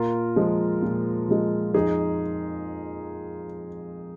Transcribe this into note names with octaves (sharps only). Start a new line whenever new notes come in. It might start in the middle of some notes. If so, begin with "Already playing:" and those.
Already playing: A#2 F4 A#4
F3 G#3
A#2
F3 G#3
F2 D#4 G#4